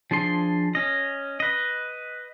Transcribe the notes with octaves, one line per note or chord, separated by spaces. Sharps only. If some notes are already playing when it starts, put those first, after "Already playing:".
F3 D4 G#4 C6
C#4 D#5
B4 D#5